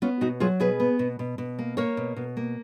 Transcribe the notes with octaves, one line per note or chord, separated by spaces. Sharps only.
B3 C#4 F4
B2 D#4 F#4
F#3 F4 G#4
B2 G#4 B4
B3
B2
B2
B2
A#3
A#3 A#4 C#5
B2
B2
A#3